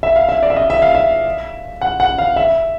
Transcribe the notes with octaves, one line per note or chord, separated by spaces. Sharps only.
E5
F5
E5
D5
E5
D#5
E5
F5
E5
F#5
F#5
F5
E5